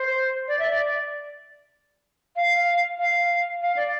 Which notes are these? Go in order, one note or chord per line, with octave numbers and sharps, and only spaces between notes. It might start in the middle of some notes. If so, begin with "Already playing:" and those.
Already playing: C5
D5
E5
D5
F5
F5
F5
D5